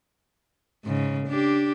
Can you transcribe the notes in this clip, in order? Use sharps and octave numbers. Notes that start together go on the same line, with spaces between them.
G#2 C#3
D4 G4